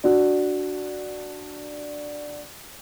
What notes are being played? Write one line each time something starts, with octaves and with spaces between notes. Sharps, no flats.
D4 F#4